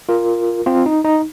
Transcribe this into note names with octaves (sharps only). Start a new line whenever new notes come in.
F4 A#4
C4 F4
D#4
D#4